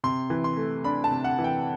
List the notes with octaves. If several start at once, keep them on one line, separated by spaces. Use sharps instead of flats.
C3 C6
E3
C6
A3
D4 B5
A5
C3
F#5
E3
G5